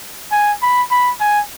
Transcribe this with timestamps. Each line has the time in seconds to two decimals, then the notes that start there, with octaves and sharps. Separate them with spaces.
0.32 G#5
0.62 B5
0.91 B5
1.20 G#5